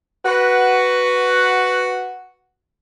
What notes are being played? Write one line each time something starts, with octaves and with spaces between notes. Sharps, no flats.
F#4 B4